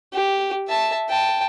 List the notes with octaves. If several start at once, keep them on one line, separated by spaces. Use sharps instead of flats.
G4
E5 A5
G5 A5